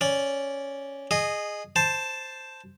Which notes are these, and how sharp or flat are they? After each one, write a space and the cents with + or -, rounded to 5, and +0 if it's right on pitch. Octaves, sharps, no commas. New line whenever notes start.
C#4 +0 D5 -10
G#4 +0 D#5 -15
C5 +0 A5 +0